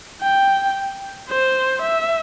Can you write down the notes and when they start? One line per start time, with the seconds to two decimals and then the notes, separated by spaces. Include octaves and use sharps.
0.22 G5
1.29 C5
1.82 E5